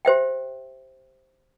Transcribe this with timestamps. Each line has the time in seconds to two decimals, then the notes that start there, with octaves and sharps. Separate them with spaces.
0.05 G4 C5 E5 G5